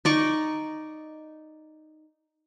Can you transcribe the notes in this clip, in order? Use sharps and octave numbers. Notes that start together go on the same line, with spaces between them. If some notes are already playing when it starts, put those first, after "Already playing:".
D#4 D5 C#6